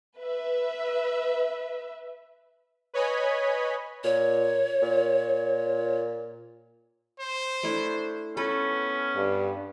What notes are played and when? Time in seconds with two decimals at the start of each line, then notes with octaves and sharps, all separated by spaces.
0.19 B4 E5
2.94 B4 C#5 D#5 G#5 B5
4.04 A#2 C#5
4.82 A#2
7.20 C5
7.63 A3 D4 E4
8.37 B3 C#4 A4 B4
9.15 G2